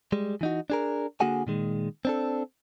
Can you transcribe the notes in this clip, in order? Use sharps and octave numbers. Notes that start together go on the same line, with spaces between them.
G3 G#3
E3 D#4 F#4
D4 G#4 A#4
D3 A#3 F#4 G#4 F#5 G#5
A#2 D#3 G#3
C4 D4 A4